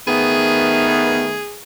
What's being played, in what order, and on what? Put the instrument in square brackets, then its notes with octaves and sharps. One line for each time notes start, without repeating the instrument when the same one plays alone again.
[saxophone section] D#3 A3 B3 [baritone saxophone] G#4